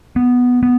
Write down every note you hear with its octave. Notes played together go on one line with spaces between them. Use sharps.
B3
B3